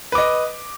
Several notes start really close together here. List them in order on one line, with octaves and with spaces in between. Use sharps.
B4 D6 D#5